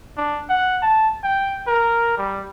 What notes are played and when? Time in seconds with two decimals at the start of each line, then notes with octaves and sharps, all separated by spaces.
0.17 D4
0.49 F#5
0.82 A5
1.24 G5
1.67 A#4
2.18 G3